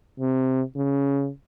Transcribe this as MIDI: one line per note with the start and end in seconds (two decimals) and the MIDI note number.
0.20 0.62 48
0.76 1.29 49